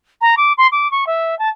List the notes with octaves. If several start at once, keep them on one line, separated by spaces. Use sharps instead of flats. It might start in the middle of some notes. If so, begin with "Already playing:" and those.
A#5
D6
C6
D6
C#6
E5
A5